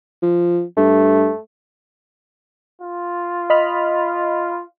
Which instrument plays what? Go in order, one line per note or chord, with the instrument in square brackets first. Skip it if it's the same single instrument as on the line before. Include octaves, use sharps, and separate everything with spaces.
[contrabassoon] F3
[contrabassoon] G2 [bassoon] A3
[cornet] F4
[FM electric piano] D#5 B5 F6